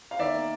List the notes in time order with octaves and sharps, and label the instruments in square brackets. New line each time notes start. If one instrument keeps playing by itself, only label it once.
[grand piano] F5
D#3 D5 E5
A#3